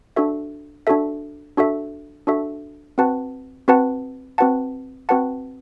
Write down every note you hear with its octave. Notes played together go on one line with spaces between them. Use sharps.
D4 F#4 A4 E5
D4 F#4 A4 E5
D4 F#4 A4 E5
D4 F#4 A4 E5
C4 F#4 B4 F#5 A5
C4 F#4 B4 F#5 A5
C4 F#4 B4 F#5 A5
C4 F#4 B4 F#5 A5